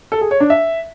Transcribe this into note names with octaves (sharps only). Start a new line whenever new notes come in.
A4
G#4
C#5
D4
E5